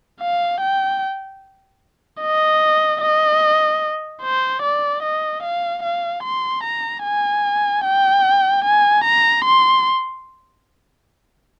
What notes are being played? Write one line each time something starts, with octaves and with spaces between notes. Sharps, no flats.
F5
G5
D#5
D#5
C5
D5
D#5
F5
F5
C6
A#5
G#5
G5
G#5
A#5
C6